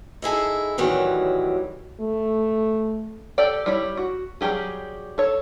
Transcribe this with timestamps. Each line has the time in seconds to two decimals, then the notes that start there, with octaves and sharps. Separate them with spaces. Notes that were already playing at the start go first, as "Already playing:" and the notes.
0.22 D#4 E4 G#4 A4
0.78 F#2 A2 D#3 E3 F#3 G3
2.00 A3
3.38 G4 A4 D5 G5
3.66 G3 E4 C#5
3.97 F#4
4.41 F#3 G3 C#4 G4 G#4
5.18 A4 C#5